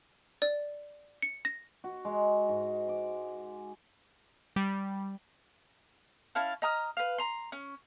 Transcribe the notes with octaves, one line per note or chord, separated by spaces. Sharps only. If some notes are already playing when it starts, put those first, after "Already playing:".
D5
C#7
A#6
F#4
G#3
G#2
D6
G3
C#4 E4 F5 A5
D#5 A#5 D#6 F6
B4 F5
A#5 C6
C#4